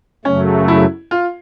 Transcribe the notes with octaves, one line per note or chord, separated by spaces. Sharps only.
F#2 C#3 F#3 A3 C#4
E4
F4